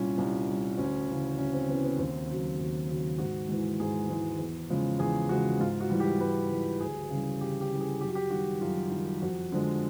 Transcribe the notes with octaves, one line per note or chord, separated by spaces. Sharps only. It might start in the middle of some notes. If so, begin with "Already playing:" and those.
Already playing: C2 A#2 G3 C#4
C2
A#2 G3
D2 C#4
C#3 E3
D2 C#4
C4
C#3 E3 B3
B3
D#2 C4
C#3 F#3
D#2
C#3 F#3
G#2 F#4
E3 G#3
G#2 G#4
E3 G#3
E2
C#3 F3 G#3
E2 G#4
C#3 F3 G#3 F#4
G#2 F4
F#4
E3 G3
G4
G#2 B4
E3 G3
D2 G#4
C#3 E3 G3
D2 G4
G4
C#3 E3 G3
G#4
F#2 G4
F#4
G4
D#3 G3 F#4
F#2 F4
D#3 G3
F2 F#4
D3 F3 G#3